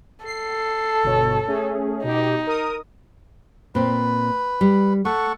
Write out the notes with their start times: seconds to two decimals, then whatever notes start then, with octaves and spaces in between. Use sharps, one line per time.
0.25 A4 C7
1.03 G1 B2 C#5
1.47 A3 C#4 G#4
2.03 B2 D#4 G4
2.47 A#4 D#6
3.75 A#2 C4 B4
4.61 G3
5.05 A3 A4 F#5 C#6